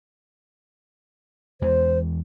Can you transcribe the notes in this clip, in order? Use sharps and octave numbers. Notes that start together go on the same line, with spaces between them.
E2 E3 G#3 C5